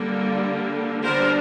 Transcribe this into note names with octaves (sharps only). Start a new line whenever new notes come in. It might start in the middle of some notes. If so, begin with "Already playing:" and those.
Already playing: D3 G3 A#3
D3 G3 B3 D4 A#4 C5